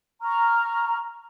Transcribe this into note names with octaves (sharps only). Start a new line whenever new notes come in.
A#5 C#6 F6